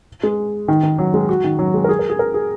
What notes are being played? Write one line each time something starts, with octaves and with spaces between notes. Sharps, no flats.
G#3
D#3
D#3
F#3
G#3
F#4
D#3
F#3
G#3
A#4
G#4
A#4
G#4
A#4
G#4